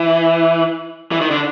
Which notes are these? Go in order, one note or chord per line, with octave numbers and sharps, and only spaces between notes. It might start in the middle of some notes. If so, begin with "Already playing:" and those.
Already playing: E3
E3
D#3
D3